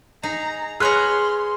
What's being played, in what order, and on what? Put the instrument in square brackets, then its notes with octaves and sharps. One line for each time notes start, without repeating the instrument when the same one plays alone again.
[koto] D#4 G#4 [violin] A#5
[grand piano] G#4 [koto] B4 C#5 A#5 [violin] C6 [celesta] F6 F#6